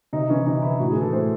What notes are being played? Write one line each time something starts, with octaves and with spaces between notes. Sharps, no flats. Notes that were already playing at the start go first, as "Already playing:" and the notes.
C3 D#4
E3 C#4
C3 D#4
E3 E4
A2 F#4
G#4
E3
A4
A2 C5